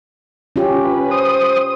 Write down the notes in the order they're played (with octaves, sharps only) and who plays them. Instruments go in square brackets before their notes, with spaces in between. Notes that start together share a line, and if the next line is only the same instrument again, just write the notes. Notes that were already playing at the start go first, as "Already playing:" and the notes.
[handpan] C#4 F4 G4
[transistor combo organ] B4
C5 D#6